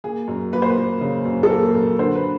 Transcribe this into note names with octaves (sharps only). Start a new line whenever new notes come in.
A#3 G#4
F#2
A#3 B4
C5
B4
A#3
C#3
F#2
A4
A#3 A#4
F#2
D3 C5
B4